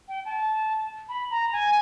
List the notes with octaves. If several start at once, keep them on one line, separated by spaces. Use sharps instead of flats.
G5
A5
B5
A#5
G#5